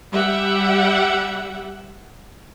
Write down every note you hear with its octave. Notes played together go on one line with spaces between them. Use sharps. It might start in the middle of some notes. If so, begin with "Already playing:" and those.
G3 G4 E5 F#5